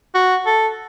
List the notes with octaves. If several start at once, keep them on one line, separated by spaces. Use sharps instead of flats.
F#4
A4